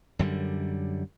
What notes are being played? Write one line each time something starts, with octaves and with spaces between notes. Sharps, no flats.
F#2 D3 G3